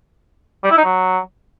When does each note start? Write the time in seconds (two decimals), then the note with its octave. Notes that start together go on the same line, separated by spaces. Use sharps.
0.64 G3
0.71 E4
0.78 D#4
0.85 F#3